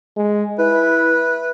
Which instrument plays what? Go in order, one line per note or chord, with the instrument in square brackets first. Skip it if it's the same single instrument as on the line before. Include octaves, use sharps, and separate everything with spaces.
[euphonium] G#3
[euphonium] E4 [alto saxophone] B4